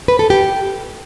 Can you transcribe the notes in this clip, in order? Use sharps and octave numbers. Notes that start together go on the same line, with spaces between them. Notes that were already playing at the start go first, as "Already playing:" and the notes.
B4
A4
G4